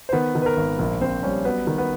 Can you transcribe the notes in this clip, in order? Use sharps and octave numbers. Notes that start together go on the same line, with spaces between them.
C5
D#3 B3 B4
D#3
B4
A#4
G#1
A#1 A#4
A#1 C4 C5
G3 C#4 C#5
F#3 B3 B4
D#3
B3 B4